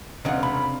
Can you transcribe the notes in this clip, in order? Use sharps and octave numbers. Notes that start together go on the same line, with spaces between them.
E1 C#3 C4 D4 D#5 F5 F#5
C3 B5